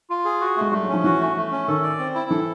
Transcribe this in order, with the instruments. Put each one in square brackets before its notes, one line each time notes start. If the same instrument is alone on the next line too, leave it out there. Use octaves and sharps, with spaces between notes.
[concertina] F4
G#4
F#4
[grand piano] G#3 [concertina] A3
[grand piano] G3 [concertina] A3
[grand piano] F#3
[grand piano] F3 [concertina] C#4
[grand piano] E3 [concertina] F#4
[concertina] A3
A3
C#4
[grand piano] D#3 [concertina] A4
[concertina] D5
C4
E4
[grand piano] E3 [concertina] A4